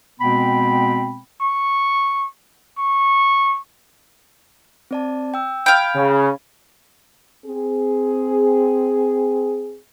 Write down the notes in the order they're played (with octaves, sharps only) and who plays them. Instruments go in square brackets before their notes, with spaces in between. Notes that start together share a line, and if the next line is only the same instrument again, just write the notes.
[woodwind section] B2 G#3 B3 C4 G5 B5
[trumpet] C#6
C#6
[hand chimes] C4 D5 A5
G5 E6
[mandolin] F5 G5 [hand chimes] B5 G#6
[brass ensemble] C#3
[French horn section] C4 G#4